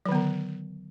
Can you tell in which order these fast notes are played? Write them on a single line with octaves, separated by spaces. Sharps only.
F#3 D#3 B3 D3